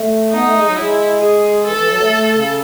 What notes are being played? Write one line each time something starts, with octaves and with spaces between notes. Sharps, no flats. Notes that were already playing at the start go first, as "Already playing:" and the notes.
Already playing: A3
B3 D#4
A3
G#3
F#3
G#3 E4
G#4
E3 A4
E3
F#3
A3
A3
C#3